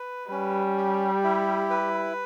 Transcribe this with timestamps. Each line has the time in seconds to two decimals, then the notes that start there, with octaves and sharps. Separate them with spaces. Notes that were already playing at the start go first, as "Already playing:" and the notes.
Already playing: B4
0.30 G3 C#4
0.77 G4
1.24 E4
1.70 B4